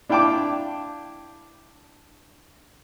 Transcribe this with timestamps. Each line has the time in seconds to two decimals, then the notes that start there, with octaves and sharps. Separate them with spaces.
0.09 D4 E4 F5 G5 A5 D6